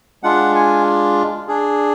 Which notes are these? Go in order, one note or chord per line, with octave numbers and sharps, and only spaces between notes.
G#3 D4 F4 F#5
G#5
D4 G#4